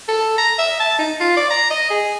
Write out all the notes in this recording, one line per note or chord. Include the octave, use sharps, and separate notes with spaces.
A4
A#5
E5
A5
D#4
F4
D5
A#5
D#5
G#4